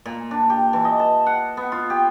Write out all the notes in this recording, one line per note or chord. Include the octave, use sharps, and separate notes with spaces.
A#2
D4
G4
E3
D#5
A5
F#5
B3
F4
G4